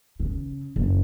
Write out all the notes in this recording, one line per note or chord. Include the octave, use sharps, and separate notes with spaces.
C#3
F#1